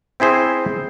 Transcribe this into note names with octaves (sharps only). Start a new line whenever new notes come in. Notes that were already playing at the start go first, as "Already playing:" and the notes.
C4 E4 G#4 C5